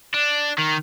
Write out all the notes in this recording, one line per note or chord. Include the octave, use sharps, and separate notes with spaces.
D4
D#3